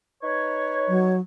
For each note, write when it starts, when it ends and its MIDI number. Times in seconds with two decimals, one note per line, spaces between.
0.22 1.15 63
0.22 1.15 71
0.22 1.15 73
0.88 1.20 54